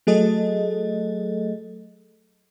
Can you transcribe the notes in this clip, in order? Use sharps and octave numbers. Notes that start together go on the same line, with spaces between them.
F#3 A3 G#4 A4 D#5